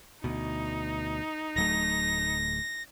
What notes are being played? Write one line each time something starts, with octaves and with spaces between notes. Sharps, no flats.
D2 B2 D#4
D1 F#3 A3 A#6